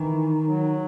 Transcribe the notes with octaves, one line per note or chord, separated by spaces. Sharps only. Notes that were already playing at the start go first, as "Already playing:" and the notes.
Already playing: D#3 E3
F#3